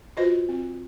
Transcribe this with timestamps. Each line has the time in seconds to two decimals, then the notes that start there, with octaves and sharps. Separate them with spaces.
0.17 F4 F#4 B4 C5 D#5
0.49 C4